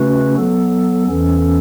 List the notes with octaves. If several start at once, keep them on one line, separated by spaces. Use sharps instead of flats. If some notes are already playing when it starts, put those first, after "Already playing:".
Already playing: C#3 A3 C#4 F#4 B4
F#3 B3 A4
E2 E3 C#4 A4